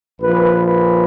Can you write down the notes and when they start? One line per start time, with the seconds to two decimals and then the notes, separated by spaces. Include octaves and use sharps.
0.21 A#1 A#2 F3 B4
0.66 B4